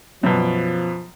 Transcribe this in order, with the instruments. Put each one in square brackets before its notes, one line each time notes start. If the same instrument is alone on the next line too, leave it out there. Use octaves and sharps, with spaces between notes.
[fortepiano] F#2 B2 [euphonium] F3